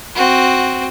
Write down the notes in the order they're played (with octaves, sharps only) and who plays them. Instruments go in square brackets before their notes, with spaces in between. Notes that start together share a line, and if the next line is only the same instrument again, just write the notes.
[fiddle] C4 F#4